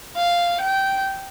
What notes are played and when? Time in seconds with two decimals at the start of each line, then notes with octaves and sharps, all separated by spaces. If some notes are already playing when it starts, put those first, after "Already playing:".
0.16 F5
0.60 G5